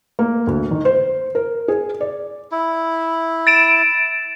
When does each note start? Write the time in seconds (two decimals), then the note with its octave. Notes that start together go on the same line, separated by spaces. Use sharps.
0.19 A#3
0.47 D2
0.71 D#3
0.85 C5
1.35 A#4
1.68 G#4
2.01 D5
2.52 E4
3.47 A6 D7 E7